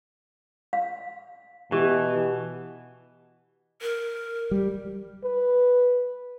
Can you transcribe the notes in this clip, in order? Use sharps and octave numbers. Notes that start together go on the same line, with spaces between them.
F5
B2 E3 G4
A#4
G3
B4